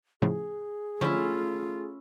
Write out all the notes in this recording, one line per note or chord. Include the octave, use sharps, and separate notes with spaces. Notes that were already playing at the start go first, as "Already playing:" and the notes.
A2 C#3 F3 G#4
D3 F3 A3 C#4 E4 F4